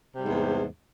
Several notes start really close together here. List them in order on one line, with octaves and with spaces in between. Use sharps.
C3 G3 G#2 E2